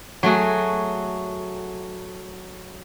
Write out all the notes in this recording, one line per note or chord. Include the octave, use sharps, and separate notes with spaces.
F#3 A3 F#4 G#4